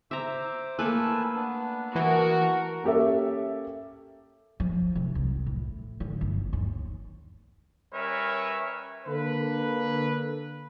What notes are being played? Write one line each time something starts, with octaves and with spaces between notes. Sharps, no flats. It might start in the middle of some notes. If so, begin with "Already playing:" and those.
C5 E5 A#5 D6
A3 A#3 B4 G#5 A5 E6
B3 D4
E3 F#4 A#4
A#3 C#4 G4 A4 E5
F3
C3
C2
A2
D3
G1
D#2
G3 C#4 A#4 B4 C#5 E5
D3 A#3 A4 B4